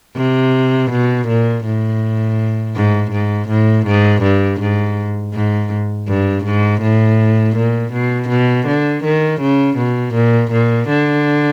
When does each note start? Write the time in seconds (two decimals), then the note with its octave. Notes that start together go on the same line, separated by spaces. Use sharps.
0.16 C3
0.91 B2
1.28 A#2
1.64 A2
2.76 G#2
3.12 G#2
3.49 A2
3.86 G#2
4.23 G2
4.61 G#2
5.34 G#2
6.08 G2
6.44 G#2
6.82 A2
7.56 A#2
7.92 B2
8.29 B2
8.67 D3
9.04 D#3
9.40 C#3
9.77 B2
10.14 A#2
10.51 A#2
10.89 D3